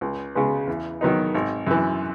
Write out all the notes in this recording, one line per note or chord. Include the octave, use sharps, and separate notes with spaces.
C#2
C#3 G#3 B3
E2
D#3 F#3 B3 D#4
G#1
F#2 E3